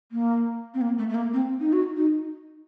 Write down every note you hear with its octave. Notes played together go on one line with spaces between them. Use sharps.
A#3
C4
A#3
A3
A3
A#3
C4
D#4
F#4
D#4